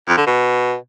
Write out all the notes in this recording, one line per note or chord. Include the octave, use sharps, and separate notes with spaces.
F2
D3
B2